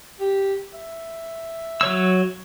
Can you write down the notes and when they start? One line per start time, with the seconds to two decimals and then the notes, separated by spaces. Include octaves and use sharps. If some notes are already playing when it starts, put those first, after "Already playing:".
0.20 G4
0.74 E5
1.81 F#3 C#5 E6